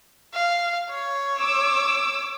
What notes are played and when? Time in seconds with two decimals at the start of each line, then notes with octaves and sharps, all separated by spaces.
0.34 F5
0.90 C#5
1.40 D6 E6